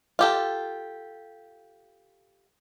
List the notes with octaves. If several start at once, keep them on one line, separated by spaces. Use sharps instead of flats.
F4 G4 A4